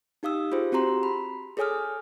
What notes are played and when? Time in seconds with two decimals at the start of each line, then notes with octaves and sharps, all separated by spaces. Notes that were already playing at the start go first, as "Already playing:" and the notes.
0.23 D#4 G4 F5 D#6 E6
0.52 F4 G4 G#4 C5
0.72 C4 F#4 G4 A#5 C6
1.03 B5
1.57 G#4 A4 C#5 G#5 D#6 F6